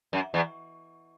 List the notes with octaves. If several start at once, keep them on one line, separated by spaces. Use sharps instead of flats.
F#2
E2